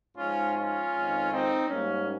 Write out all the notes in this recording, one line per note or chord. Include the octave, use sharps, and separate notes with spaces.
G#2 F3 G#3 C#4 F4
C#4 F4
F2 D#3 G#3
C4 D#4
G#2 G3 A#3 C#4